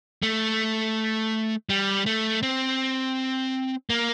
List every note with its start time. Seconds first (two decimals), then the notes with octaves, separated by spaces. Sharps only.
0.23 A3
1.69 G3
2.06 A3
2.43 C4
3.90 A#3